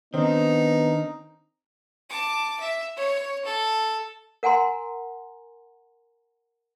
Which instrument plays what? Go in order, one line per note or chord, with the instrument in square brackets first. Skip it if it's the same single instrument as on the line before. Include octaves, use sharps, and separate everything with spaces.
[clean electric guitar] D#3 D4 [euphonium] B3 [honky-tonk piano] C4 [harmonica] D#4
[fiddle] A5 D6
E5
C#5
A4
[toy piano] A#4 F#5 G#5 A#5 C6